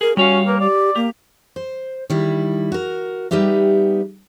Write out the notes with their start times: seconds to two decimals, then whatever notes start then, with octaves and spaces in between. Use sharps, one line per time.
0.01 G#4 A#4
0.17 G3 C#4 F#4 C#5 F5
0.46 A#3 B4
0.60 G4 D5
0.96 A#3 G4
1.56 C5
2.10 D#3 G3 E4
2.72 F#4 A#4
3.31 G3 B3 D#4 G4 E5